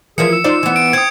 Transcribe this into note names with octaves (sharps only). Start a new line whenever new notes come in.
E3 F3 E4 G#4 A#4 E5 C#7
E6
D#4 F4 C5 D5
E3 B3
D7
C4 D#6 G#6